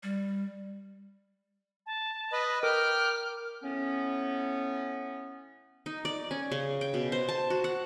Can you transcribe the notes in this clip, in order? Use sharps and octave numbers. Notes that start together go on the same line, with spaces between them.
G3
A5
B4 D#5 B5
A#4 G5 D6 F6
A2 B3 C#4
D#4
D5
C#4
C#3
G5
B2
C5
A5
F#4
F#5